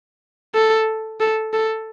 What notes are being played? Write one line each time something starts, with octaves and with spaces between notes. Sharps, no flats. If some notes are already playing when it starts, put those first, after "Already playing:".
A4
A4
A4